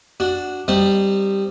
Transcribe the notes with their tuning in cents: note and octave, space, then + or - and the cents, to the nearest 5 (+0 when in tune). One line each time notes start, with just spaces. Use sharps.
D4 +0 F#4 +0
G3 +0 C4 +0 D#4 -20